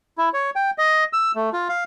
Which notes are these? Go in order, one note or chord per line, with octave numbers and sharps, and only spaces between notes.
E4
C#5
G5
D#5
E6
A3
F4
F5